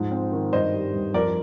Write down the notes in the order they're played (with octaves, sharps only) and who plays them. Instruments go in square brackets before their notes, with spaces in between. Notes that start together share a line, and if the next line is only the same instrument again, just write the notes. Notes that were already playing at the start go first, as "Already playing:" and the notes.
Already playing: [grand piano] G#2 F3
C4
D#3
[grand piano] G2 [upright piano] C5 D#5
[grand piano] G3
G2
[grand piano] F2 [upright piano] A#4 D5